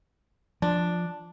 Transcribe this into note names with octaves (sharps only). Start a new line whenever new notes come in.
F3 D4